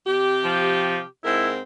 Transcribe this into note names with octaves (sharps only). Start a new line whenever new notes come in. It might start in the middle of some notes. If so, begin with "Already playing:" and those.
C3 G4
F3
G#2 C4 E4 A#4